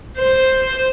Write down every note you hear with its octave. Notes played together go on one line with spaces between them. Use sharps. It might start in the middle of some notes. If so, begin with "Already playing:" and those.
C5